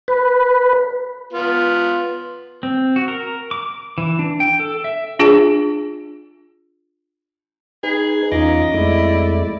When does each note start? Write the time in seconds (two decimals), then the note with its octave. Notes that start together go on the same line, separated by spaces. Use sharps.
0.08 B4
1.33 B3 F4
2.63 C4
2.96 F#4
3.08 A#4
3.51 D6
3.98 E3
4.19 D4
4.40 G5
4.60 A4
4.84 E5
5.19 D4 F4 G#4
7.83 D#4 G#4 B4
8.32 E2 C#4 D#4 F4 D#5 D6
8.74 F2 G#3 A3 E4 D5